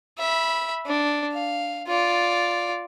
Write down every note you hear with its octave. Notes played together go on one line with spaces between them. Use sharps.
E5 B5
D4
F5
F4 D5